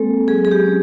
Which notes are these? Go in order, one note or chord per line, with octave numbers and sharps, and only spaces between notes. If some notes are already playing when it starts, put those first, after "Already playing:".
Already playing: G#3 A#3 C4 A4
F#3 G#4
G#4
G4
C#4